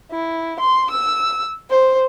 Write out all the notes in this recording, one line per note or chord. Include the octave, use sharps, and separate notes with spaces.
E4
C6
E6
C5